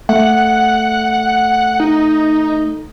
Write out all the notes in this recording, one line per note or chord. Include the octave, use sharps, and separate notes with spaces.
A3 F#5
D#4